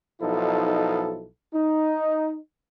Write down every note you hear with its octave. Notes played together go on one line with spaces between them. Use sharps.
B1 F3 D#4 E4 A4
D#4